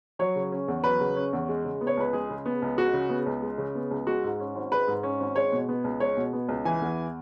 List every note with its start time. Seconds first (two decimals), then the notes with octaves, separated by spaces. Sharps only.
0.19 F#3 C#5
0.36 C#3
0.52 C#4
0.68 E2
0.84 F#3 B4
1.00 C#3
1.16 C#4
1.33 E2
1.49 G#3
1.64 C#3
1.81 B3
1.87 C#5
1.97 C#2 B4
2.13 G#3 G#4
2.30 C#3
2.46 B3
2.62 C#2
2.77 G#3 F#4
2.93 C#3
3.09 B3
3.26 C#2
3.42 G#3
3.58 C#3
3.75 B3
3.91 C#2
4.07 G#3 F#4
4.24 G#2
4.40 C#4
4.55 G#1
4.72 G#3 B4
4.88 G#2
5.03 C#4
5.20 G#1
5.36 G#3 C#5
5.52 B2
5.69 B3
5.84 C#2
6.00 G#3 C#5
6.17 B2
6.33 B3
6.49 C#2
6.65 E3 G#5
6.81 E2